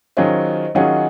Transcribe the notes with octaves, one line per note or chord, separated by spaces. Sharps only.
D#3 F#3 C#4 F4 G#4 C5 D#5
D#3 F#3 C#4 F4 G#4 D#5 F#5